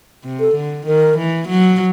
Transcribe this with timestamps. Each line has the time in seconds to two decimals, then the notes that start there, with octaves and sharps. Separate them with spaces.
0.24 C3
0.40 A4
0.55 D3
0.86 D#3 A#4
1.17 E3
1.48 F#3